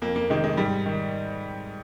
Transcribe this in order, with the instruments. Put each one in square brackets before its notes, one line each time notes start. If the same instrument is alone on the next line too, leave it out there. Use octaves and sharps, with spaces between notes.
[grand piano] F2 A#3
A#3
C3 D#3 G#3
G#3
G#2 G3
D#3